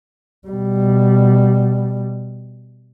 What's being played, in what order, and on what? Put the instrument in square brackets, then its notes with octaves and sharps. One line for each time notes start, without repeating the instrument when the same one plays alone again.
[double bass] B2 G3